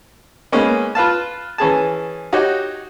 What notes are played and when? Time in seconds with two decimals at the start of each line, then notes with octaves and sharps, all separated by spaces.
0.52 G#3 A#3 B3 C#4 D#4
0.95 F4 B4 F5 A5
1.58 E3 C#4 G#4 A5
2.33 D#4 F#4 G4 C#5